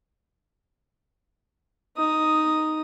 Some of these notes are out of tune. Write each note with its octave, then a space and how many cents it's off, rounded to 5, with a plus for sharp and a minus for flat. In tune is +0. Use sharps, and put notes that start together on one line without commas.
D#4 +0 D#6 +0